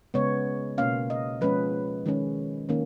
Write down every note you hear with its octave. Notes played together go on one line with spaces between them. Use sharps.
C#3 G#3 B3 C#5
B2 A#3 C#4 F5
D#5
F3 G#3 C#4 B4
D#3 G#3 C#4
D#3 A#3 C#4